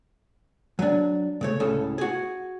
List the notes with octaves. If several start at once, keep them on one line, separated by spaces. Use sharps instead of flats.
F#3 D4
C#3 A3 C#5
C#2 A2 C#3 A4
F#4 G#4